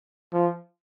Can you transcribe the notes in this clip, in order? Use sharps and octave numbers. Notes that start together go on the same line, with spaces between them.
F3